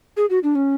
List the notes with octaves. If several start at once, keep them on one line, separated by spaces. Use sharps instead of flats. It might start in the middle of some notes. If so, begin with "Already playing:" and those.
G#4
F#4
D4
C#4